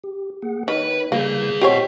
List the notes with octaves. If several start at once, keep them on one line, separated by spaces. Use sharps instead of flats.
G4
A#3 G#4 F#5
D#3 D#4 B4 C#5
C#3 G3 A#3 E4 G#4 G6
C4 F4 G4 C5 C#5 D#5 F#5